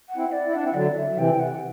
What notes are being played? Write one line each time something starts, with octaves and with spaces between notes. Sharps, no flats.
F#5
C4 E4
D5
E4
D4 F#5
C4 E4
D3 F#3 D5
E5
C3 E3 G5
F#5